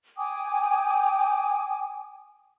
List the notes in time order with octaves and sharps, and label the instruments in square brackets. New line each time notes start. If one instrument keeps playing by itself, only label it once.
[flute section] G5 G#5 D6 D#6